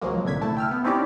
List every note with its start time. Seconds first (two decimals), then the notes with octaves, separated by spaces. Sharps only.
0.01 C#2 C#3 F3 F#3 G#3 A#3
0.25 C2 A#2 D3 G#6 B6
0.41 A3 E4 A5
0.57 G5 E6 F6
0.71 B3
0.84 C4 C#4 D#4 E4 G4 D5